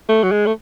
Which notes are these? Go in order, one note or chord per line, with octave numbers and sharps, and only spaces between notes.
A3
F#3
G#3
A3